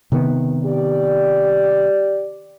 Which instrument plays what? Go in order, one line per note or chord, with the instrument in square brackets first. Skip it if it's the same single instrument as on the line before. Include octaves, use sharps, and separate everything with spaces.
[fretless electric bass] C3 D#3 B3
[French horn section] G4 D5